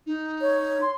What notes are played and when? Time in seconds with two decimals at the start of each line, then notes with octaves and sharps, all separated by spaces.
0.06 D#4
0.41 C#5
0.81 C6